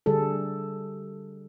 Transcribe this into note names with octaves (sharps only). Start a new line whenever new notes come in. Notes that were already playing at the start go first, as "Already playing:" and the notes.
D3 G3 G#4 A4